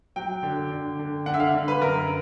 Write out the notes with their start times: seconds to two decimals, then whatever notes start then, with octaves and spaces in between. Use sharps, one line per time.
0.16 F#3 G5
0.43 D3
0.71 D3
0.99 D3
1.26 D3 F#5
1.34 E5
1.40 F5
1.55 D3
1.68 B4
1.81 F#2 A#4